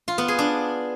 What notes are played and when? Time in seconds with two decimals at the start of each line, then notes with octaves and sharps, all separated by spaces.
0.08 F4
0.18 B3
0.28 G#4
0.39 D4